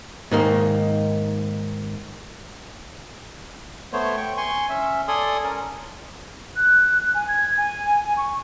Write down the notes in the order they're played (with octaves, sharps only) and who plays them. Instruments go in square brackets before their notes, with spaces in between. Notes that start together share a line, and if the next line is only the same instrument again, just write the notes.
[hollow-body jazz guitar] G#2 D#3 A#3
[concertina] A3 B3 C5 C#5
G5 C#6
G#5 C6 C#6
C#4 E5
A4 D5 G#5 C6 D#6
C#4 A#4
[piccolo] F#6
G#5
G#6
G#5
G#5
C#6